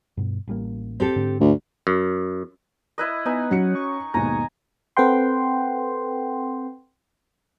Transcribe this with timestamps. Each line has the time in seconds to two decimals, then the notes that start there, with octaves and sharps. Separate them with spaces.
0.17 G2 B2
0.48 A1 G3 A#3
1.00 C4 G4 A4
1.16 G#2 D3
1.41 D2
1.87 F#2
2.98 E4 B4 D#5
3.26 B3 D#4 G#5
3.51 F#3 C#4 F#4 C#7
3.75 C#6
4.14 D#2 G#2 B2 G#5 A#5
4.97 C4 A4 B4 F#5 G5 C6